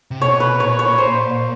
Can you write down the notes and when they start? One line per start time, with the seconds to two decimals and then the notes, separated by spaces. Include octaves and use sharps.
0.11 C3
0.21 B2 C#5
0.40 B4
0.59 A#2 C#5
0.79 C#5
0.98 C5